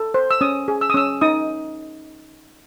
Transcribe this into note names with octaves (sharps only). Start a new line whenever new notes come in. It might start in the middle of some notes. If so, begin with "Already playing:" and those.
Already playing: A4
C5
E6
C#4 D#6
G#4
E6
D#6
C#4 E6
D#4 D#6